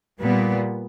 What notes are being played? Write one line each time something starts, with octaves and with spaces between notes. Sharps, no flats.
A#2 G3 B3